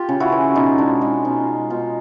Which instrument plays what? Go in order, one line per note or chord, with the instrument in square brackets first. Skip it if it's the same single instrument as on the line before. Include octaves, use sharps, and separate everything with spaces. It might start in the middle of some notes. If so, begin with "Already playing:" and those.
Already playing: [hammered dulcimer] F4 G4
C#3
E4 F#4
E3
B2 D#4 F4
G#3 D4 E4
G#3 D#4 F4
B2 C#4 D#4
G#3
B2 D#4 F4